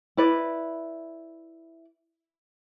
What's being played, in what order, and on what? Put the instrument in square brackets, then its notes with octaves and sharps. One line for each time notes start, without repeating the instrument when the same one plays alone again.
[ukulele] E4 B4 D5